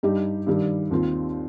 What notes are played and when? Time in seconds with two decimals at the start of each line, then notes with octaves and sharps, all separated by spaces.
0.03 G2 G3 D#4 G4
0.47 G2 D#3 G3
0.91 D#2 D#3 C4 F4